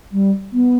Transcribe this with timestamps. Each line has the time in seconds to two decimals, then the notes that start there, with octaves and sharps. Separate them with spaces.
0.12 G3
0.53 B3